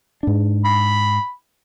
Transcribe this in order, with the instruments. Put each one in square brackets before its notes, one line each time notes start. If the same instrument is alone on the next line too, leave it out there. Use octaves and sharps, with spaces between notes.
[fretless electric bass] G#2 D4
[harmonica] B5